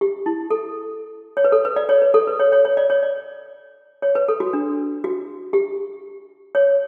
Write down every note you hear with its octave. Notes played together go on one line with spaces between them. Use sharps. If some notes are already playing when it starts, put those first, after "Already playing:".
G4
E4
A4
C#5
B4
A4
B4
D5
C#5
B4
A4
B4
C#5
C#5
C#5
D5
C#5
D5
C#5
B4
A4
F#4
D4
F#4
G4
C#5